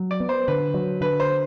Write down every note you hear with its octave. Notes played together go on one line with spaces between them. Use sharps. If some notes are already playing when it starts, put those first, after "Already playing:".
Already playing: F#3
D5
B3
C5
D3 B4
F#3
D3 B4
C5